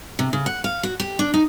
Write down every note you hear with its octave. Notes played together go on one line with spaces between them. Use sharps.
C3
C#3
F#5
F5
F#4
G4
D4
D#4